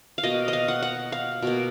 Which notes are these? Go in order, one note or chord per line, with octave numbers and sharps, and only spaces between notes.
F5
B2 A#3 D#5
D#5
F5
F#5
F#5
F5
B2 A#3